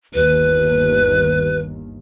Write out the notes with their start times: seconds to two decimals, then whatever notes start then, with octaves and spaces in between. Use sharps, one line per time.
0.14 G1 D#2 B4